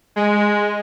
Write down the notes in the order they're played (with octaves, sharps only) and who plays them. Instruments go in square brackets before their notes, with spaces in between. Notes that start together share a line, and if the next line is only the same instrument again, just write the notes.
[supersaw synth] G#3